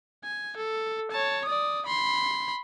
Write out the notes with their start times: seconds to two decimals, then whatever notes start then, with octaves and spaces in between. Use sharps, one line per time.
0.24 G#5
0.57 A4
1.11 C#5 A5
1.45 D5 D#6
1.86 B5 C6